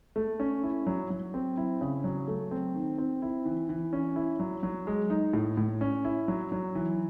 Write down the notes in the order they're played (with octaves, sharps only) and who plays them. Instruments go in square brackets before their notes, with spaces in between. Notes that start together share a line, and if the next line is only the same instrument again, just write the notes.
[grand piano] A3
C#4
E4
F#3
F#3
C4
E4
C#3
F#3
A3
C4
D#3
C4
E4
E3
E3
C#4
E4
F#3
F#3
G#3
D#4
A2
A2
C#4
E4
F#3
F#3
E3